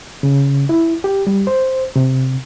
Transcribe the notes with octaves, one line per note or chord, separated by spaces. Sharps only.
C#3
E4
G4
G3
C5
C3